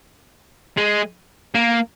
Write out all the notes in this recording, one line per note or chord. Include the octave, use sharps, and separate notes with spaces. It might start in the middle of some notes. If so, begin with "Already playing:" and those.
G#3
A#3